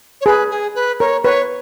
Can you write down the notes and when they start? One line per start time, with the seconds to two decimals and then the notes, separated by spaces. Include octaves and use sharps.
0.21 C#5
0.26 G#4 B4
0.50 G#4
0.75 B4
1.00 A#4 C#5
1.24 B4 C#5